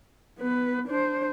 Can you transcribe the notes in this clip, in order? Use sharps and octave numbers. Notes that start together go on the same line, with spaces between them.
B3 B4
D4 C5